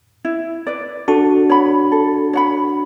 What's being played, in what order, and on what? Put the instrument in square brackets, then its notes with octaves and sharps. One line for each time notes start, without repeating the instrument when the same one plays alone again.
[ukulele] E4
B4 D5
[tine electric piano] D4 F#4 [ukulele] A4
[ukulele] C#5 F#5 B5
A4
C#5 F#5 B5